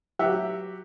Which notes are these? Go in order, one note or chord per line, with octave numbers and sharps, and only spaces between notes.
F#3 G4 E5 F#5